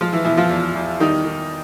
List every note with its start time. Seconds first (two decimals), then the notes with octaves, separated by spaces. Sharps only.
0.01 F3 G#3 F4
0.13 E3 E4
0.25 B2 E3 E4
0.37 F3 F4
0.50 E2
0.75 E2
1.00 D#3 G3 D#4
1.25 D#3